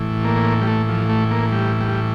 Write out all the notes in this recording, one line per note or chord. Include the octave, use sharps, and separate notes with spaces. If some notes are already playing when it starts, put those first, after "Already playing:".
Already playing: A2 E3
A#3
G3
A3
F3
A3
A#3
G3
G3